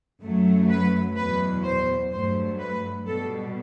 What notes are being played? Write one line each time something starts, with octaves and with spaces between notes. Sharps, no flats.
F#2 F#3 A3
B4
E2 B2 F#3 B4
C5
G2 F#3 A3 C5
B4
B2 G3 A4